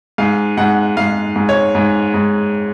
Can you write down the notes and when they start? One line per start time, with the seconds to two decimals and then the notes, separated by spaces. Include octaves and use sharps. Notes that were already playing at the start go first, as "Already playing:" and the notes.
0.18 G#2 F5
0.57 G#2 F#5
0.97 G#2 F5
1.36 G#2
1.49 C#5
1.75 G#2
2.14 G#2